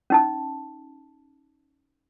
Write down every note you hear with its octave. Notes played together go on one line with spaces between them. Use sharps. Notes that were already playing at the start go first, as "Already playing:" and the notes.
C#4 D#4 A5